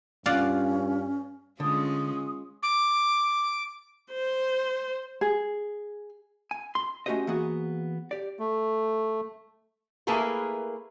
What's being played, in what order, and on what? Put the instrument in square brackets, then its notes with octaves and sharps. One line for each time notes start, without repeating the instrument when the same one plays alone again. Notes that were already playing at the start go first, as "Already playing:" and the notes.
[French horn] G2 [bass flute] C#4 [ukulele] F4 [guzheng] D5 F5 F#5
[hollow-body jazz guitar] D3 [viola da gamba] G#3 C#4 F4 [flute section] D#6
[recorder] D6
[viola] C5
[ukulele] G#4
[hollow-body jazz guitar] G#5
C6
A3 C#4 F#4 G4 C5 D#5
E3 A#3 B3 F#4 G#4
G4 D5
[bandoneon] A3
[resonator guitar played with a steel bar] A3 A#3 E4 G#4 A#4 B4